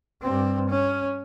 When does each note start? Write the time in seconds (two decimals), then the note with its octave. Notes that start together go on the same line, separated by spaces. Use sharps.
0.22 G2 C4
0.69 C#4